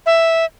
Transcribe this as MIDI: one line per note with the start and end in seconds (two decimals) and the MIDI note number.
0.06 0.45 76